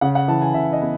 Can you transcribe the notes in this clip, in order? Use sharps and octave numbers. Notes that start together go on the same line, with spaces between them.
C#3 F#5
F#5
E3 A5
G#5
C#3 E5
D#5
B3